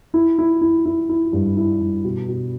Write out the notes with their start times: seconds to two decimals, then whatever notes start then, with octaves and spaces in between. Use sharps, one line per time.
0.14 E4
0.38 E4
0.61 E4
0.85 E4
1.09 E4
1.33 G2
1.57 E4
1.80 G2
2.04 B2
2.28 B2